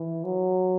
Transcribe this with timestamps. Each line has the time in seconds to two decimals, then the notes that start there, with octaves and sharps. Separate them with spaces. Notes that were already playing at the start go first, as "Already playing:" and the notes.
Already playing: E3
0.24 F#3